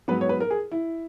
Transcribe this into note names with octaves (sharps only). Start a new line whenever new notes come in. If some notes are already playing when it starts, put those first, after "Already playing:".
G#2 F#3 B3 B4
C#5
B4
A#4
G#4
E4